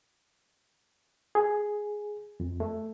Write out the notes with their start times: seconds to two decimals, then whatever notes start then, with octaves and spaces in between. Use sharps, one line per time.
1.35 G#4
2.40 F2
2.60 A3